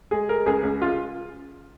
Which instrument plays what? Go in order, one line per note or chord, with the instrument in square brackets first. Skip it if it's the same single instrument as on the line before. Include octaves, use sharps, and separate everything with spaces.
[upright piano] G#3 G#4
G#3 A#4
C#2 G#4
C#2
C#3 F4